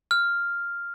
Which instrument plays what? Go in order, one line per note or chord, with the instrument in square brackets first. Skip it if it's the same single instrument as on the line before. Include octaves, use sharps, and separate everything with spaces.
[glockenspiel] F6